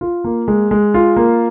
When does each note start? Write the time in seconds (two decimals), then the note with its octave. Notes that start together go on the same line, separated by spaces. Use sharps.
0.01 F4
0.24 A#3
0.48 G#3
0.71 G#3
0.94 F4
1.17 A#3